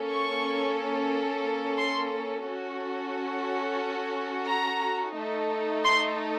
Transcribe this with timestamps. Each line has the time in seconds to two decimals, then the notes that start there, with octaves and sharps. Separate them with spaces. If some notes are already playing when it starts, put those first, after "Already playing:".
Already playing: A#3 C#4 A4
0.10 C#6
1.78 C6
2.46 C#4 F#4 A4
4.49 A#5
5.16 A3 D#4 A4
5.83 C6